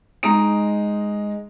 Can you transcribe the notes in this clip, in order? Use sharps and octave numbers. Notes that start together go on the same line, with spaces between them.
G#3 D#4 A#5 D#6 D7